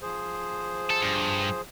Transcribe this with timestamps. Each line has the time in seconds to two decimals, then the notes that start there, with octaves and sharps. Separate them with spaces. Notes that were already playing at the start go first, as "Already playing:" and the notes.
0.02 F3 G#4 C5
0.90 A4
1.03 G2